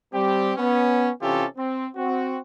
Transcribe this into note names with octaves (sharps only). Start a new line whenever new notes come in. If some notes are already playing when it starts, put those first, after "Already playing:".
G3 C4 G4
B3 C#4
C3 E3 C#4 F4 G4 A4
C4
C4 F#4